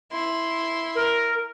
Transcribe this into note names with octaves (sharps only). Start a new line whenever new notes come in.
E4 C6
A#4